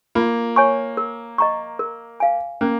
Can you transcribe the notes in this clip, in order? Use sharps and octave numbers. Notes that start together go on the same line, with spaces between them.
A#3 F4
C#5 G#5 C#6
A#4
D#5 A#5 C#6
A#4
F5 G#5
A#3 C#4